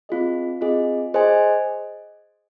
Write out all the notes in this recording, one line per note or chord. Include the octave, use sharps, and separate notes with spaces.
C4 F4 G#4 D#5
C4 F4 G#4 D#5
G#4 C5 D#5 G#5